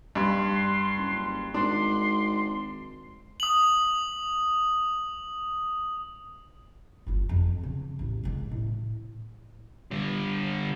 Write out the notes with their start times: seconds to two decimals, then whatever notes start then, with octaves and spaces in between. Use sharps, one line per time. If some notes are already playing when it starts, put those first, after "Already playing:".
0.15 G2 C6
0.96 F#1
1.54 G#1 D4 C6
3.40 D#6 F#7
7.07 G1 F4
7.29 F2
7.63 C#3
7.99 A1 E2
8.24 C#3 G#3
8.51 A2
9.91 D3 G3